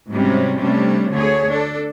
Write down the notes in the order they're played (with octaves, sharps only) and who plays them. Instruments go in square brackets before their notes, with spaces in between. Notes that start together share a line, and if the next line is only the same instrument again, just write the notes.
[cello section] G#2 C3 F#3 G3 C#4
C3 G3 A3 C#4 D4
D2 D3 A3 G#4 C#5
D4 A4